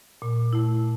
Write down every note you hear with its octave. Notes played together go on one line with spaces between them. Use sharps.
A#2
A3 E4